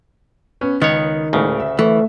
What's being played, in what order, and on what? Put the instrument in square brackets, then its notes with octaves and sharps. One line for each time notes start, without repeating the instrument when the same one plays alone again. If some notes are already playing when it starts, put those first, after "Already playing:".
[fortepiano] B3 C#4
[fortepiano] C#2 [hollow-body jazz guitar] D#3 [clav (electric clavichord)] B3 C#5
[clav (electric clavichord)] D2 C#3 [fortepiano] A2 G#3 A#4
[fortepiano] E5
[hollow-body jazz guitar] E3 [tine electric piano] A3